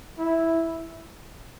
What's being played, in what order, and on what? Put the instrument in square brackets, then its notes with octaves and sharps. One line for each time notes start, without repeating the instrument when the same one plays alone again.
[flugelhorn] E4